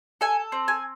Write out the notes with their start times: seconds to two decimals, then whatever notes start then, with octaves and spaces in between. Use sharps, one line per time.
0.21 A4 G#5
0.52 C4
0.68 G#5